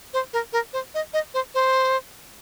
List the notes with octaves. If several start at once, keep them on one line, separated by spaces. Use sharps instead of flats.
C5
A#4
A#4
C5
D#5
D#5
C5
C5